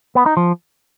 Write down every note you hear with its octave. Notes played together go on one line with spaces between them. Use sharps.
B3
D#4
F3